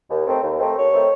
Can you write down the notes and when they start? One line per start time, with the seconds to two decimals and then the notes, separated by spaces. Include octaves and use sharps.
0.10 D#2
0.26 D#3 A3 C4
0.42 D#2
0.59 D#3 A3 C4
0.76 D#2 C#5
0.93 D#3 A3 C4